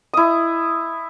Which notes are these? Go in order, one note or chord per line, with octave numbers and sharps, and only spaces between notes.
E4 D#6